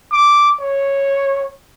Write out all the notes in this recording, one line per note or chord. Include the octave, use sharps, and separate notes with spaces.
D6
C#5